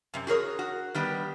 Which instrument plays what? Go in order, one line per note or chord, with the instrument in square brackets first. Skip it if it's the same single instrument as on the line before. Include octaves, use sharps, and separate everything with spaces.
[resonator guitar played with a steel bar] F#2 C3
F#4 G#4 A#4 C#5
F#4
D#3 G3 B3